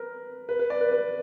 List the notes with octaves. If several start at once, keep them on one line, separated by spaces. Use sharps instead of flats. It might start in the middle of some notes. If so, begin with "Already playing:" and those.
Already playing: A#4 B4
B4
B4
D5
B4
B4